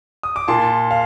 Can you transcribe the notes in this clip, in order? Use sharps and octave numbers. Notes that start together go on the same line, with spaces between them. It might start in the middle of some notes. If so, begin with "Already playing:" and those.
D#6
D6
A#2 A5 C6
F5